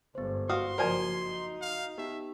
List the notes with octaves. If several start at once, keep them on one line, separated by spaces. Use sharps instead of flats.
G1 G#2 B3 C5
F#4 F5 C6 D#6
F#1 F3 F#4 A#4 C5 G#5
D#4
F5
B3 D#4 G4 E5